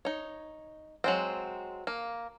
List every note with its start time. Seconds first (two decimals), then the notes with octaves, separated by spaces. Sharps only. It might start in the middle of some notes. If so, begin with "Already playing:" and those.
0.05 D#4 C#5
1.04 F#3 G#3 C4
1.87 A#3